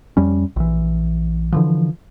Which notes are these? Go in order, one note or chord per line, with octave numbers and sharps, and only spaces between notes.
F2 G3 C#4
A#1 E3
D3 E3 F3